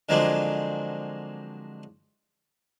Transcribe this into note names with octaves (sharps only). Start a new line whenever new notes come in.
D3 F3 F#3 G#3 A#3 C4